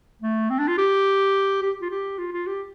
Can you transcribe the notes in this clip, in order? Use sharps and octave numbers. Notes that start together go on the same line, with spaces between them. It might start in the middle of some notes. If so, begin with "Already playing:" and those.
A3
C4
D4
F4
G4
G4
F4
G4
F4
F4
G4